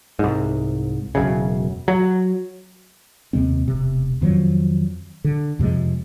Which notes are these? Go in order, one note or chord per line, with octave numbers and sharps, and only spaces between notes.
C2 G#2
E1 F#2 C#3
F#3
D#2 C3 G#3 C4
E1 C3
F2 D#3 F3 F#3
D3
F2 C3 F3 G#3